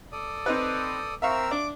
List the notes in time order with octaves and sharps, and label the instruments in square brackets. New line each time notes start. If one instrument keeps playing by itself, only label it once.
[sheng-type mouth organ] A4 D5 D#6
[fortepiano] C4 D#4 B4
[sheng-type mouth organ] C4 A#4 E6 [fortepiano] E5 F5 C#6
[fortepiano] D4 [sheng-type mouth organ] D6